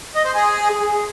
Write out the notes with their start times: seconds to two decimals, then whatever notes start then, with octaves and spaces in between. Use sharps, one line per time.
0.15 D#5
0.25 C5
0.34 G#4